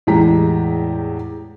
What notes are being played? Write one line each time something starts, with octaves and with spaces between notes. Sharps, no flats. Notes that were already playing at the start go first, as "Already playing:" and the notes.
E2 A2 G#3 G4 A#5 B6